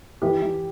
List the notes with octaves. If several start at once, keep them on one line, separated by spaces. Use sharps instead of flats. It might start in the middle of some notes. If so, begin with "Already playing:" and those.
E3 G4
E3